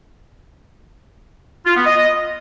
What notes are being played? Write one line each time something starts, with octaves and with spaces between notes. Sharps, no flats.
F4
B3
D#5